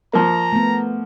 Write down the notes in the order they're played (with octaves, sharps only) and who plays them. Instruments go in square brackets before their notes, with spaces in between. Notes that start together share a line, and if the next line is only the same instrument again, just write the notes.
[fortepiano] F3 A#3 [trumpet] A#5
[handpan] A3 B3